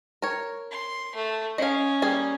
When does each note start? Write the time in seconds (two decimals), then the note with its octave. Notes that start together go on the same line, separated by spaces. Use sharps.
0.22 A#4 C#5
0.71 C6
1.15 A3
1.58 C#4 D#5 F5
2.02 G3 A#3 G#4